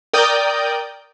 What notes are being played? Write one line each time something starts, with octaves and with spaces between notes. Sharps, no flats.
A#4 D5 G5 D#6 G6